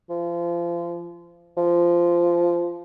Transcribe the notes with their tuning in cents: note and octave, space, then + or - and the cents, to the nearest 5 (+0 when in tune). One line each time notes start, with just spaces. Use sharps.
F3 -30
F3 -15